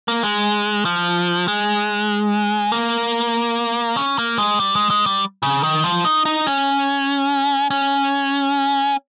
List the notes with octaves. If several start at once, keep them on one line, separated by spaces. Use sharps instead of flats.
A#3
G#3
F3
G#3
A#3
C#4
A#3
G#3
G3
G#3
G#3
G3
C#3
D#3
F3
D#4
D#4
C#4
C#4